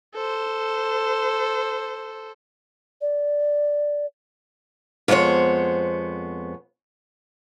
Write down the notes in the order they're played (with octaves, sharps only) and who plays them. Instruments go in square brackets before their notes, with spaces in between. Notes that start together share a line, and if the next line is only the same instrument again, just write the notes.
[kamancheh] A4 C5
[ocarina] D5
[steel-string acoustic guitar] F2 G#3 B3 C5 C#5